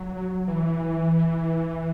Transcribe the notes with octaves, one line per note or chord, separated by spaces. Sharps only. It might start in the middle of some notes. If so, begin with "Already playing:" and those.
Already playing: F#3
E3